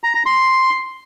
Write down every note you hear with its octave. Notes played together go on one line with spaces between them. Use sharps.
A#5
A#5
C6